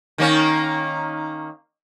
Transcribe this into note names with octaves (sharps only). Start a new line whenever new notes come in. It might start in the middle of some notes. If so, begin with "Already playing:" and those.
D#3 A#3 C#4